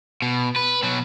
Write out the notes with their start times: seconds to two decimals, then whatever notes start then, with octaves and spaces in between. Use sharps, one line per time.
0.22 B2
0.56 B4
0.83 B2 F#3